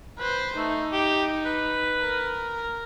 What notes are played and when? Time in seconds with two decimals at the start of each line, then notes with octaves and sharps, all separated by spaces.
0.19 B4 C5
0.57 A3 D#4
0.92 G4
1.45 B4
2.01 A#4